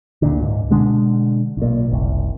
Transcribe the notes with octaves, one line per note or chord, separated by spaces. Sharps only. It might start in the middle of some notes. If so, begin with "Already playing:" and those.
D2 A#2 D3
C#2 G#2
B2 D3 G#3 D4
B1 A#2
F#1 C2